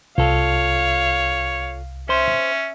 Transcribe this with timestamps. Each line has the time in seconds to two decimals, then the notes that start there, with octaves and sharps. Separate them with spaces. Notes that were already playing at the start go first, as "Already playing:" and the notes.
0.18 C2 F4 A4 C#5 F5
2.09 C#4 C5 E5 C6